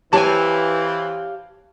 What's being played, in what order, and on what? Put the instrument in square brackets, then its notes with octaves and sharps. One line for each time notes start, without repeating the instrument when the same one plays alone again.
[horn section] E3 C4 [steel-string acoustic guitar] G4 C#5 F5 [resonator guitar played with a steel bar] G#5 A5